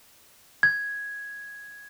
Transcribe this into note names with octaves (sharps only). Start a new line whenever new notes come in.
G#6